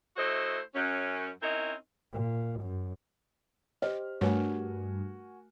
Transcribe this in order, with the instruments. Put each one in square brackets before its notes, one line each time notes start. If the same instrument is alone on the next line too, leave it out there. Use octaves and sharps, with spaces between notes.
[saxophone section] A3 E4 F#4 C5 D#5
F#2 C#4
C4 C#4 D#4 E4 A#4
[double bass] A#2
F#2
[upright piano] G4 C5 F6 [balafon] D#5
[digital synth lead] G2 [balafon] A3 B4 C#5 [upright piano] F#4 A#4 G#5